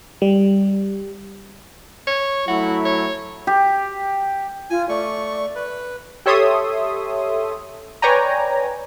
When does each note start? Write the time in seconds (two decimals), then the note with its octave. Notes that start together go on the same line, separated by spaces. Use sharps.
0.22 G3
2.07 C#5
2.48 F#3 A3 E4 F#4
2.85 C#5
3.47 G4
4.70 F4 G#5
4.89 A3 D5 C#6
5.55 B4
6.26 G4 A4 C#5 E5 C6 D#6
8.02 B4 C#5 D5 G5 G#5 A#5